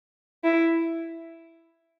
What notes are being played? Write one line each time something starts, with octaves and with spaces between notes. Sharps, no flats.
E4